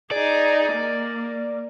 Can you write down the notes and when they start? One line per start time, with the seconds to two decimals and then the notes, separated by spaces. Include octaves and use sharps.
0.11 D#4 G#4 D5
0.73 A#3